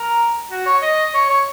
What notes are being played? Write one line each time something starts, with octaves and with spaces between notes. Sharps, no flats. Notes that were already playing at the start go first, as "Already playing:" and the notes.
Already playing: A#4
F#4
C#5
D#5
C#5
C#5